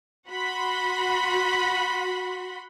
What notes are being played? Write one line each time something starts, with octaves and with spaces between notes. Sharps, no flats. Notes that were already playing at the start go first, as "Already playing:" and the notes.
F#4 F#5 B5 C6